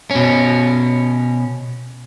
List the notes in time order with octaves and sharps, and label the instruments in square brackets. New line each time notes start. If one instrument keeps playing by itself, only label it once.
[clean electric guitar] B2 C#4